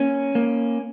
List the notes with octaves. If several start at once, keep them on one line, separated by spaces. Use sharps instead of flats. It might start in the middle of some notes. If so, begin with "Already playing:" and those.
Already playing: A#3 C#4
A#3